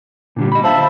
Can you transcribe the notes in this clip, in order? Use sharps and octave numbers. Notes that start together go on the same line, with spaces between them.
A#2 D3 G3
D#5 B5
C5 E5 F5 A5 B5